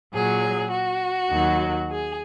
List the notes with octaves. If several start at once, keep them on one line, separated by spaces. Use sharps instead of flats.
A#2 F#3 G#4
F#4
D#2 D#3 F#3
G#4